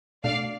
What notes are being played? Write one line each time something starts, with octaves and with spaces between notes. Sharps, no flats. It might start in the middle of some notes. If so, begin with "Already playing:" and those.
B2 A3 D4 D5 F5